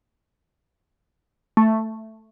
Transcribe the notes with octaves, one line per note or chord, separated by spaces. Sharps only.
A3